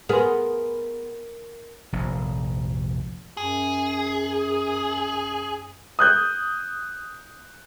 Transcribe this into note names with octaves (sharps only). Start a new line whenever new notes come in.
B3 G#4 A#4 C6
F1 A#1
F#2 G#4
D#6 F#6 G6